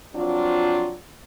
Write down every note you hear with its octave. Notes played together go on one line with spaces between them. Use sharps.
F3 F#3 C4 D4 F4